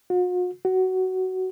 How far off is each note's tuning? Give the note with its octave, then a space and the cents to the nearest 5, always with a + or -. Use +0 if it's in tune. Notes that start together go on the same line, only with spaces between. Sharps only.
F#4 -45
F#4 +15